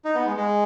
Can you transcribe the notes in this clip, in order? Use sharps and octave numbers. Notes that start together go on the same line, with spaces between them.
D#4
B3
G#3
G#3